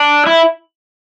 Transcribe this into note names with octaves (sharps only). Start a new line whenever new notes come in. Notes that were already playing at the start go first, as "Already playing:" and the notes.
Already playing: D4
E4